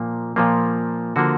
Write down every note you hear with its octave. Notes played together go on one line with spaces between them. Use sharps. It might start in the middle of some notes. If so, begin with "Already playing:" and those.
Already playing: A#2 F3 A#3
A#2 F3 A#3
D3 F3 A#3 F#4